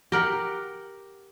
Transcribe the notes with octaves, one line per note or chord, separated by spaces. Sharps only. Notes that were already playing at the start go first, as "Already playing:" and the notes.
G4 A#4 F#5